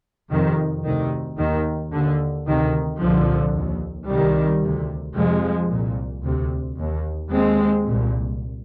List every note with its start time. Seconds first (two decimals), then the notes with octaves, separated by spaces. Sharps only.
0.31 F2 C3 D#3
0.84 D2 C3 D#3
1.39 D#2 D#3
1.93 D#2 D3
2.46 D2 C3 D#3
3.00 C2 A#2 D3 F3
3.54 D#2
4.08 C2 C3 D#3 G3
4.62 D2 C3
5.16 F2 C3 F3 G#3
5.70 C2 A#2
6.23 D2 C3
6.78 D#2
7.31 D#2 G#3 C4
7.86 C2 A#2